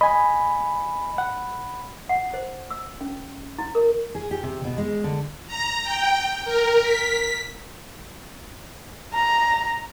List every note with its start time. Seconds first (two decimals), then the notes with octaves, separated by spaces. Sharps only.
0.01 D#5 G#5 B5
1.18 F#5
2.09 F#5
2.34 C5
2.71 E6
3.01 C#4
3.58 E4
3.75 A#4
4.15 G#4
4.31 G4
4.43 C3
4.64 B2
4.78 G#3
5.04 D3
5.47 A#5
5.83 G5
6.45 A#4
6.82 B6
9.14 A#5